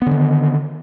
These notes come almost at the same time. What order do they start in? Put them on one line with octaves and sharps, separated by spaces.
B3 D3 D#3